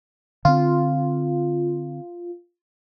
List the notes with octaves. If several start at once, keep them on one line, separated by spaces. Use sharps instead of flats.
D3 C4 F4